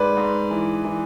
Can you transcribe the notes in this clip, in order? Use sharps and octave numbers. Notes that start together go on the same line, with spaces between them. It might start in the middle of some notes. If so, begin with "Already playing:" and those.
Already playing: G#2 B4 D5
G#2
E3
E3